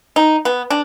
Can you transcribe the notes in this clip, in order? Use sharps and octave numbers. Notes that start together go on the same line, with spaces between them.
D#4
B3
D4